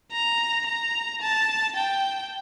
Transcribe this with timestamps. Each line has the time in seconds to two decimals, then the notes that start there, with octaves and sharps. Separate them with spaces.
0.12 A#5
0.66 A#5
1.21 A5
1.76 G5